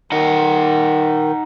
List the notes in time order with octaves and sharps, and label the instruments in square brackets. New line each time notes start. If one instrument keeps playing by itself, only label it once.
[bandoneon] D#3 [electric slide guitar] D#4 D#5 F#5